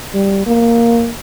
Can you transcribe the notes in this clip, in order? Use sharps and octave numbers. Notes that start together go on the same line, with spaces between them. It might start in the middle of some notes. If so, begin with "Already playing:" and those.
G3
A#3